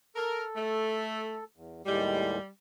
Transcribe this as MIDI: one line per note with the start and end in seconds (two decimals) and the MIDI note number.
0.16 1.44 69
0.16 0.41 70
0.55 1.37 57
1.56 1.82 40
1.86 2.38 39
1.86 2.38 45
1.86 2.47 55
1.86 2.38 56